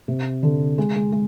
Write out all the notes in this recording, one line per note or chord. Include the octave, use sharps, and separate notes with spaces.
C3
D3
G#3
G#3
G#3